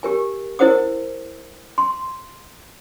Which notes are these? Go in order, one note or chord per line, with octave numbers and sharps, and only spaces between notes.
G4 A#4 G#5
E4 A#4 C5 F#5 D#6
C6